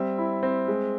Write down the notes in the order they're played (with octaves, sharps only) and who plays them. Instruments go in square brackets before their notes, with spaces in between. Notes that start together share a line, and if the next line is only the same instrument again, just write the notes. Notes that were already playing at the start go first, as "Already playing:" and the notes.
Already playing: [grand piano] G3 C4 E5
E4
C4
G#3